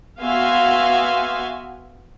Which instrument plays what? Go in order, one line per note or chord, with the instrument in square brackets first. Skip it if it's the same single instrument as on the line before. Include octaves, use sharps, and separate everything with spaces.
[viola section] B3 F#4 E5 F5 G#5 C6